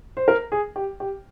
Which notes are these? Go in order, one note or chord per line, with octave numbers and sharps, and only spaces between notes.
C5
A#4
G#4
G4
G4